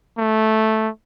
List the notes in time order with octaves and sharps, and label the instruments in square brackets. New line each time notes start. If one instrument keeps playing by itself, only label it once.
[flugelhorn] A3